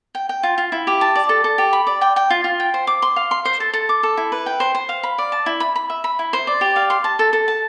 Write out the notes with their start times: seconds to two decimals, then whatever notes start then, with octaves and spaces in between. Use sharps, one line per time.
0.15 G5
0.29 G5
0.43 F4
0.58 F4
0.72 E4
0.87 G4
1.01 A5
1.15 D5
1.29 A4
1.44 A4
1.58 G4
1.73 B5
1.87 D5
2.01 G5
2.16 G5
2.30 F4
2.44 F4
2.60 G5
2.74 C5
2.87 D6
3.02 C6
3.16 F5
3.31 C6
3.45 C5
3.60 A4
3.73 A4
3.89 D6
4.03 A4
4.17 E4
4.32 B4
4.46 G5
4.60 C5
4.75 C5
4.89 F5
5.03 B5
5.18 D5
5.32 A5
5.46 E4
5.60 B5
5.76 B5
5.90 E5
6.04 B5
6.19 E4
6.33 C5
6.47 D5
6.61 G4
6.76 F5
6.90 C6
7.04 A5
7.19 A4
7.33 A4
7.48 A5